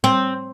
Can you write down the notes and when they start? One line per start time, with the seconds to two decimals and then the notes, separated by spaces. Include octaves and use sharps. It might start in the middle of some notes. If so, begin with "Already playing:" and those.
0.04 C4